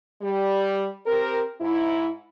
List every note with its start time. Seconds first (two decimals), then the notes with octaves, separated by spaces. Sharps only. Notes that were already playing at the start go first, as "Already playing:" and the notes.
0.22 G3
1.06 C4 G4 A#4
1.61 G#2 E4